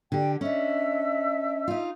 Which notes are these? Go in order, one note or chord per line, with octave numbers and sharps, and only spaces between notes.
D3 G4 D5 G5
C#4 D4 D#5 E5 E6
D#4 F4